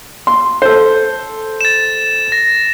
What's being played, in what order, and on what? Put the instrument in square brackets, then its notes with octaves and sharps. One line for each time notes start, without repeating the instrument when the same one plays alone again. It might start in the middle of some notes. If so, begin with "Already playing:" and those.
[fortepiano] C6
A4 C5
[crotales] A6 E7
A#6